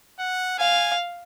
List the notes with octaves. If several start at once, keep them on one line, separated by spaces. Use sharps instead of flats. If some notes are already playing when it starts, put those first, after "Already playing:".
F#5
F5 G#5